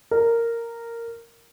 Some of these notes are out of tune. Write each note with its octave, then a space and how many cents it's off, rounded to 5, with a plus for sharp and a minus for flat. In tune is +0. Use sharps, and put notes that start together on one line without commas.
A#4 -10